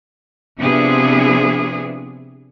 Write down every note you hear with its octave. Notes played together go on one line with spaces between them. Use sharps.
C3 F3 B3 D4 E4 G#4